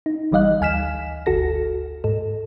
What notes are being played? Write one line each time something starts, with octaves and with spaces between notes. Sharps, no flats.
D#4
G#1 E3 G3 D#5 F5 F#6
D2 G#5 F6 B6 E7
G1 D2 F#4 A4 A#6
G#2 A4